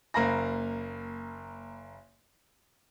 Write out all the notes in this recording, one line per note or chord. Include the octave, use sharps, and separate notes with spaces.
F#1 A#3 F5 A#5 B5 A#6